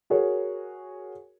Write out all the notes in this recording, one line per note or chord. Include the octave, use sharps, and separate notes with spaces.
F#4 G#4 A#4 C#5